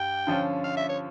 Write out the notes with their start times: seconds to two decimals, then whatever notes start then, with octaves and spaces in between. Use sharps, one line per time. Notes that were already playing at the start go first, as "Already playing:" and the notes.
Already playing: G2 G3 G5
0.27 D3 F3 C#4 F4
0.64 F5
0.77 E5
0.89 C#5